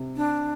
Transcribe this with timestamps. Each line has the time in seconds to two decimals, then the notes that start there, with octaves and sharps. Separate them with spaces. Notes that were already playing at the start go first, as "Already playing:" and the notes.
Already playing: C3
0.16 D4